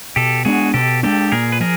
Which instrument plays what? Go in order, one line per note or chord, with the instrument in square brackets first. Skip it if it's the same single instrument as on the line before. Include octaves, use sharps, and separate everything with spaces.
[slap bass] B2 [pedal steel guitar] G4 A4
[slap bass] G#3 B3 D4 [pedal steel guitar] F#4 G#4
[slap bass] B2 [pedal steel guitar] G4 A4
[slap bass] G#3 B3 D4 [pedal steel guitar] G4 A4
[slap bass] A#2 [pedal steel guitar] G#4 A#4
[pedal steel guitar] B4
[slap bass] F3 [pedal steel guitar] G#4 A#4